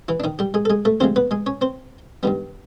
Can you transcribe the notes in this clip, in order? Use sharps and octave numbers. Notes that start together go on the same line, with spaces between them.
E3 E4
D4
D#3 D#4
G3 G4
G#3 G#4
A4
G#3 G#4
A3 A4
D2 C3 F3 G#3 C4 C5
B3 B4
G#3 G#4
C#4 C#5
C4 C5
G2 D#3 G3 B3